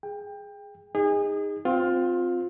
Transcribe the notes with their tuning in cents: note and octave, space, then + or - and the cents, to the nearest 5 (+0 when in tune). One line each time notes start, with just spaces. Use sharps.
G#4 +0 G5 +25
D#4 +0 G#4 -30 D#5 +0
C4 -10 F4 +20